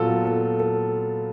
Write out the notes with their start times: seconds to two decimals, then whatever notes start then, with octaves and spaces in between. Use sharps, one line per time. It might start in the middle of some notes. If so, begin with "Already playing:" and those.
Already playing: A#2 F#3 B3 F4 A4
0.25 A4
0.60 A4